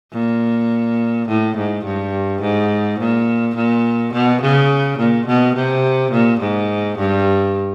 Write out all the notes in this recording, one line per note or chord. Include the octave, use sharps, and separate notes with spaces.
A#2
A2
G#2
G2
G#2
A#2
A#2
B2
C#3
A#2
B2
C3
A#2
G#2
G2